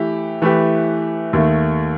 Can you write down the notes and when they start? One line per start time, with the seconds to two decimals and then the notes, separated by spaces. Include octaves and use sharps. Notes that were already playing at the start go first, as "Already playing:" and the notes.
Already playing: E3 A3 E4 G4
0.42 E3 A3 E4 G4 B4
1.33 D#2 D#3 A3